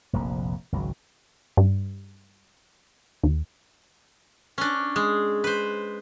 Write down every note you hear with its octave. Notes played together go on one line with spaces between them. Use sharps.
F1 A#1 F2 A#3
G#1 C#2 D3 F#3
G2
D#2
C#4 D4
G#3
B4 C5